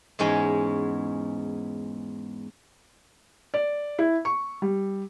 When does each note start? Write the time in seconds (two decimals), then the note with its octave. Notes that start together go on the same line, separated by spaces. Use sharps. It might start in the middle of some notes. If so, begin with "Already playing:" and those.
0.19 E2 G#2 G#3 C#4 G#5
3.54 D5
3.99 E4
4.25 C#6
4.62 G3